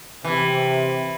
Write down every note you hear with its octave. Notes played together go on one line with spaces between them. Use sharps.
C3 E3